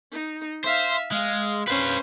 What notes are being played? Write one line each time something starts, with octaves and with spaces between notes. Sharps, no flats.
D#4
C5 E5 F5
G#3 F5
C#4 B4 C5 F5